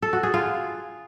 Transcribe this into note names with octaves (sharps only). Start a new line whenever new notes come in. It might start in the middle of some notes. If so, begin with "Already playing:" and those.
A4
F#4
G#4
F4